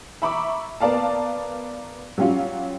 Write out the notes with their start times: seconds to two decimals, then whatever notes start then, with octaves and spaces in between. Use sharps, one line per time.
0.22 E5 A#5 B5 C#6 D6 E6
0.80 B3 A#4 D5 F5 A5
2.18 F#3 G3 C#4 F4 F#4